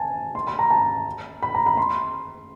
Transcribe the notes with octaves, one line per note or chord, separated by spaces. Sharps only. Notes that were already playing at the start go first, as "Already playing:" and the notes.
Already playing: G#5 A5
C6
B5
A#5
A5
B5
A#5
B5
C6